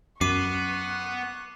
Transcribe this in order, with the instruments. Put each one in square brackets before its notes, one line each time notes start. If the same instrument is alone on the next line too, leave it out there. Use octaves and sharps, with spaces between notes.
[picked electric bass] F#2 [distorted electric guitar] B3 [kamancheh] C#6 F#6 [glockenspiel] D6 C7 D#7